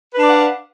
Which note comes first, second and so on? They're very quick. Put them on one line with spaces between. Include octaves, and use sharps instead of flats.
B4 D4 D5 F#5 F5